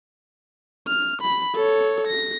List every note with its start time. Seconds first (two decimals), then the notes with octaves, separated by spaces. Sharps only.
0.87 F6
1.22 B5
1.55 A4 C#5
2.07 A#6